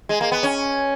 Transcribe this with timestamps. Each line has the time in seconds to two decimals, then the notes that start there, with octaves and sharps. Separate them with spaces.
0.09 G#3
0.21 A#3
0.32 B3
0.43 C#4